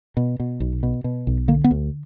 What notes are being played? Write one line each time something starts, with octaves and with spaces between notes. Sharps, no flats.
B2
B2
B1
B2
B2
B1
D3 A#3
B3
D2